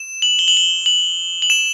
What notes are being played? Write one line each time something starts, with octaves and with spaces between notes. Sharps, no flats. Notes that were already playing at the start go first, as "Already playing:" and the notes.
Already playing: E7
F#7
G7
F#7
G7
F#7
F#7
E7